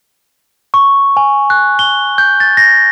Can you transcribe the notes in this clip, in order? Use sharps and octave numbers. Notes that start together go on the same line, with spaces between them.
C#6
G#5
F#6
G7
G6
A6
A#6